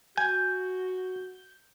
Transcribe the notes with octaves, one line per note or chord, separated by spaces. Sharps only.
F#4 G#5 G6